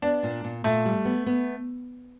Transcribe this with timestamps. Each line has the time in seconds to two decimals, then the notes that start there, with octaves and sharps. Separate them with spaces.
0.02 B3 D4
0.23 A#2
0.44 A#2
0.64 A#2 A3
0.86 G3
1.05 B3
1.26 B3